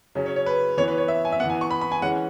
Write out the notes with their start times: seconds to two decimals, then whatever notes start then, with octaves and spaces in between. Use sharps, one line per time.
0.15 C#3 F#3 C#4
0.26 C#5
0.36 C#5
0.46 B4
0.77 E3 B3 C#5
0.88 B4
0.98 C#5
1.08 E5
1.25 G#5
1.32 E5
1.39 B3 F#5
1.44 E3
1.50 G#5
1.61 C#6
1.71 B5
1.81 B5
1.92 G#5
2.02 E3 G#3 C#4 F#5